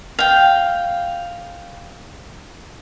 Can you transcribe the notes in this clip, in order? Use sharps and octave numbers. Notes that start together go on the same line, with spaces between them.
F5 G5